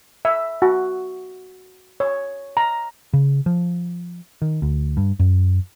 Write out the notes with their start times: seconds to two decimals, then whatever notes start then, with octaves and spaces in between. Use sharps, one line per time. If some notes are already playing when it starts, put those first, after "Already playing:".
0.25 E5
0.62 F#4
2.00 C#5
2.57 A#5
3.13 C#3
3.46 F3
4.42 D#3
4.62 D2
4.97 G2
5.19 F#2